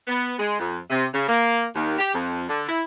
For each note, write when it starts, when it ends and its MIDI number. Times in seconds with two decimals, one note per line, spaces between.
0.08 0.36 59
0.39 0.57 56
0.60 0.79 41
0.90 1.05 48
1.14 1.27 49
1.28 1.66 58
1.75 1.96 39
1.98 2.12 67
2.14 2.44 41
2.49 2.65 50
2.68 2.83 64